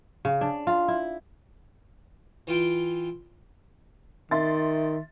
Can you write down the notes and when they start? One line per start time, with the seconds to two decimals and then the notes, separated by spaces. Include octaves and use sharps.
0.25 C#3
0.41 D4
0.67 F4
0.88 E4
2.47 E3 F4 G5
4.31 D#3 E5 C6 A6